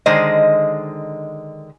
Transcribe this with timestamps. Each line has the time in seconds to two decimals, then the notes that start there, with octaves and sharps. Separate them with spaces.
0.06 D3 D#3 G#3 C5 D#5